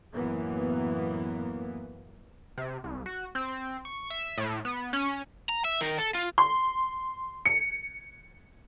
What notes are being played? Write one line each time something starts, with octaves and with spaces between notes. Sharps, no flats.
F#2 A2 E3 A#3 B3
C3
C2
F#4
C4
C#6
E5
A2
B3
C#4
A#5
E5
D#3 A#4
A4
F4
C6
C#7